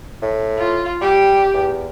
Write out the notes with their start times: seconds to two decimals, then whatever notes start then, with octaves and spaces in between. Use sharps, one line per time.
0.22 A2
0.58 F4
1.01 G3 G4
1.54 E2